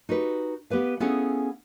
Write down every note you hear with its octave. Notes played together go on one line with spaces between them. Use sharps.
D#4 F#4 G4 B4
B3 G4 B4 F5
B3 C#4 E4 G#4 A4 F5